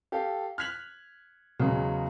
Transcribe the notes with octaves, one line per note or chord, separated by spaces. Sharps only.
G4 A4 F5
F6 F#6 G#6 B6 F7 F#7
E2 C#3 F#3 G#3